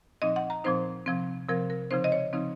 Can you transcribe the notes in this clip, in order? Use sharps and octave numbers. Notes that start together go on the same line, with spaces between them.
A#2 F3 C4 D#4 D#5
F#5
A#5
A#2 F3 C4 D#4 C5
C3 F3 C4
C3 F3 C4 A#4
A#4
C#3 F3 C4 D#4 C5
D#5
C#5
C#3 F3 C4 D#4